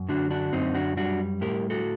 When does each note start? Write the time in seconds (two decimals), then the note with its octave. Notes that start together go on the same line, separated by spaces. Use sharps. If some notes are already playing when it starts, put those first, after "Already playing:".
Already playing: F#2
0.09 D3 D4 F#4
0.31 D4 F#4
0.53 F#2 C4 D#4
0.74 D4 F#4
0.97 G3 D4 F#4
1.41 A2 G4 A#4
1.70 F#4 A4